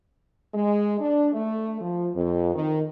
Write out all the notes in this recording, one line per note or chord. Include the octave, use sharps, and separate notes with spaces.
G#3
D4
A3
F3
F2
D#3